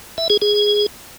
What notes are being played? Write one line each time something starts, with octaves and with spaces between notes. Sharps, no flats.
E5
G#4
G#4